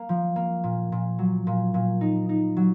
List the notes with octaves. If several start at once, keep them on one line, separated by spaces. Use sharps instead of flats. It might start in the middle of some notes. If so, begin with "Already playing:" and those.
Already playing: A#3
F3
A#3
A#2
A#2
F#3
A#2
A#2
D#4
D#4
F#3